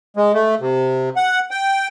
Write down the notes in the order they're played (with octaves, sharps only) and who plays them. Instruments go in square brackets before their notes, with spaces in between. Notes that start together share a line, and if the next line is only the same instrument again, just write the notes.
[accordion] G#3
A3
C3
F#5
G5